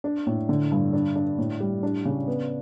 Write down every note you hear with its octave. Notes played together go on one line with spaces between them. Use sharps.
D4
A2
D3
G2
D4
D4
A2
G3
D4
C#3
B3